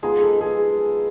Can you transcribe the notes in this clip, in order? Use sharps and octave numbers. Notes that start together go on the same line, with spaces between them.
F3 G#3 B3 D#4 G#4
A4
G#4